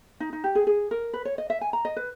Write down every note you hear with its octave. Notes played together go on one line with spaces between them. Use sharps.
D#4
D#4
G4
G#4
G#4
A#4
B4
C#5
D#5
E5
G#5
A#5
D#5
B4